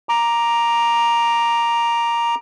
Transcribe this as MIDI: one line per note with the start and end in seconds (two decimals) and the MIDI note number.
0.09 2.35 82
0.09 2.35 86